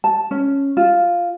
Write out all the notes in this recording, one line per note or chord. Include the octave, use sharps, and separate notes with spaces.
A5
C#4
F4